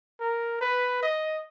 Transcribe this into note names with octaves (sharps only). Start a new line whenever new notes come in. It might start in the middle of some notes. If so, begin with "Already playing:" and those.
A#4
B4
D#5